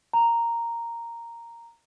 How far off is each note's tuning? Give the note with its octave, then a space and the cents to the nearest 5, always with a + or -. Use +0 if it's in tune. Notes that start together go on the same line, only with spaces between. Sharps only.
A#5 -5